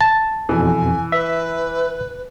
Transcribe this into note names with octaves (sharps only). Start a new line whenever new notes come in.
A5
F2 B2 E3 G#5
B4 E5